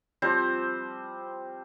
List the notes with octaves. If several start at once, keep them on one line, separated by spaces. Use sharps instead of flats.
F3 G3 C4 C5